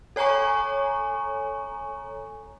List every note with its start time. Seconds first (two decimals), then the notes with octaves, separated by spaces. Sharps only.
0.16 A4 C#5 G#5 A#5 C#6